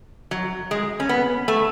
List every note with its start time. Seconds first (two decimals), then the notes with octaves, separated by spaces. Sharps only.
0.31 F#3
0.71 G#3
1.00 C#4
1.09 B3
1.48 A3